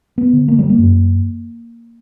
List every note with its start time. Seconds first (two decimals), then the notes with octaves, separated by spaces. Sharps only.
0.18 B3
0.33 D3
0.48 A#3
0.59 G3
0.69 A#3
0.78 F#2